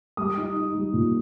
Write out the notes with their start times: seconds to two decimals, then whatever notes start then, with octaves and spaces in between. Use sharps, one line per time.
0.17 G3 D#6
0.37 D#4
0.56 D#4
0.75 G3
0.93 A#2